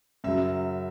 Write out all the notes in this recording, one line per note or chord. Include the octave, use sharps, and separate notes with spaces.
F#2 C#3 F#3 E5